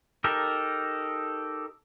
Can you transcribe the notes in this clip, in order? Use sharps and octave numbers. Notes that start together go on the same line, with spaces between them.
D#4 G4 A4 A#4